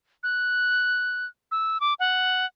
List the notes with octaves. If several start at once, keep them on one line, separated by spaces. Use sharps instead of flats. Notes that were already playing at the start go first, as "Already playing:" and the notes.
F#6
E6
D6
F#5